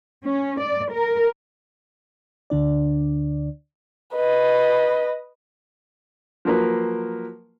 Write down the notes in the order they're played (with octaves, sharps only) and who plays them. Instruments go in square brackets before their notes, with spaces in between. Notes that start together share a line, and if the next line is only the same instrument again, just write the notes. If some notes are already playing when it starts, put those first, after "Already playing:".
[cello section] C#4
D5
A#4
[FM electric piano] D2 D3 D4 D5
[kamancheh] B4 D#5
[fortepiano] F3 F#3 A#3 A#4 B4